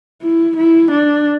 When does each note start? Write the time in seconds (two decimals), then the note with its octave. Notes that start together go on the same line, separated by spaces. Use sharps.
0.22 E4
0.57 E4
0.91 D4